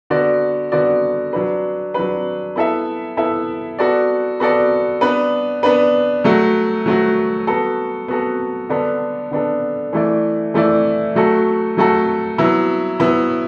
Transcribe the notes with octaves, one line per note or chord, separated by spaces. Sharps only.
D3 B3 F#4 D5
D3 B3 F#4 D5
F#3 D4 B4
F#3 D4 B4
B3 E4 A4 E5
B3 E4 A4 E5
B3 F#4 A4 D5
B3 F#4 A4 D5
B3 D4 B4
B3 D4 B4
F#3 A3 F#4
F#3 A3 F#4
B3 F#4 A4
B3 F#4 A4
D3 B3 D4 A4
D3 B3 D4 A4
E3 A3 E4 D5
E3 A3 E4 D5
F#3 A3 F#4 A4
F#3 A3 F#4 A4
F#3 B3 E4
F#3 B3 E4